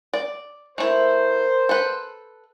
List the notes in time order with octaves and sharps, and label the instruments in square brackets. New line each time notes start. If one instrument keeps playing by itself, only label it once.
[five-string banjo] D5
[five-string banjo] A3 E4 [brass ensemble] A#4 C5
[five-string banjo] A4 B4